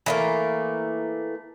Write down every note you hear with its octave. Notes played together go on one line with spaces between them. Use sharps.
E3 A3 A#3